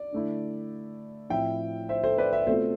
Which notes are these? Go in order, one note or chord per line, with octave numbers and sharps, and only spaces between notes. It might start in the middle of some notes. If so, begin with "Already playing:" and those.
Already playing: D5
D3 A3 E4
A2 F3 C4 E4 E5 G5
C5 E5
A4 C5
B4 D5
C5 E5
B2 A3 C4 F4 A4 C5